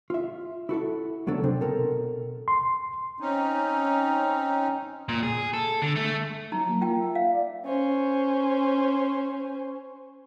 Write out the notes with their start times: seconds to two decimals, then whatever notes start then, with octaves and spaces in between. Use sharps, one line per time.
0.10 F4 E5
0.69 E4 F#4 A4 E5
1.27 C#2 F#3 B3 D4 A4
1.44 C3 C4 D4
1.61 B2 A4 A#4
2.48 C6
3.20 C4 C#4 D#4
5.09 A#2
5.23 G#4
5.53 A4
5.82 D3
5.96 A3
6.52 F#3 D#4 A#5
6.69 A#3
6.81 F4 G5
6.99 E5
7.15 F5
7.31 D5
7.65 C#4 C5